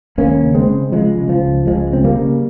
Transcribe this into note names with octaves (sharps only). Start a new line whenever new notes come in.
D#2 A#3 C#4
C#3
G#3 C4
C#3
C#3 F3 G#3
C#3
F3
C#2
C#2 F3 G#3
C#3 C4
G3 A#3
C#3